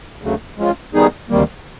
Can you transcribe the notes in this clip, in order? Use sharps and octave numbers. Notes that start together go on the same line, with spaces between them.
D2 C#3 F#3 A3
F3 G#3 C#4 F4
D#3 G3 B3 D#4 G#4
D2 C3 D#3 G3 A#3